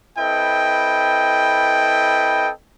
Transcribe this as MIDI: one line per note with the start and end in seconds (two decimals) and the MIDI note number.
0.17 2.50 60
0.17 2.50 64
0.17 2.50 69
0.17 2.50 71
0.17 2.50 75
0.17 2.50 79